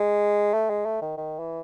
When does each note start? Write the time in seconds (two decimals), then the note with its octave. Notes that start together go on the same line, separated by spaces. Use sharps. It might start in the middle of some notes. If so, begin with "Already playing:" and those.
Already playing: G#3
0.54 A3
0.70 G#3
0.85 A3
1.02 D#3
1.18 D#3
1.39 E3